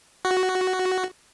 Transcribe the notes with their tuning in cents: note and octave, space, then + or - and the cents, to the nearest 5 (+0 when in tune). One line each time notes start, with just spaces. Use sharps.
F#4 +5